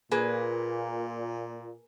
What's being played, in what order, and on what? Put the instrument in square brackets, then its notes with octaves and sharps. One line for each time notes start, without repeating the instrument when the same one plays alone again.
[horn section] A#2 [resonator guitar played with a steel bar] A#3 G#4 B4